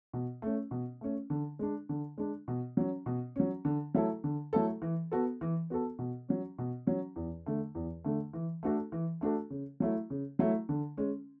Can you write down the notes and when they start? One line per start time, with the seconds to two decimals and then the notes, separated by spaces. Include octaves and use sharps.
0.13 B2
0.42 A3 C#4
0.71 B2
1.01 A3 C#4
1.30 D3
1.59 G#3 D4
1.89 D3
2.18 G#3 D4
2.48 B2
2.77 F#3 C#4
3.06 B2
3.36 F#3 C#4
3.65 D3
3.94 F#3 A3 E4 A4
4.24 D3
4.53 F#3 A3 E4 A4
4.82 E3
5.12 B3 F#4 A4
5.41 E3
5.70 B3 F#4 A4
5.99 B2
6.29 F#3 C#4
6.58 B2
6.87 F#3 C#4
7.16 E2
7.46 D3 A3
7.75 E2
8.04 D3 A3
8.33 E3
8.63 A3 D4 F#4 A4
8.92 E3
9.21 A3 D4 F#4 A4
9.50 C#3
9.80 F#3 A3 E4
10.10 C#3
10.39 F#3 A3 E4
10.69 D3
10.97 G#3 C#4